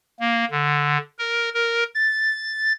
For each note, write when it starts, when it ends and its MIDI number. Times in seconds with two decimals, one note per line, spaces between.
0.20 0.45 58
0.51 0.98 50
1.19 1.50 70
1.54 1.84 70
1.94 2.72 93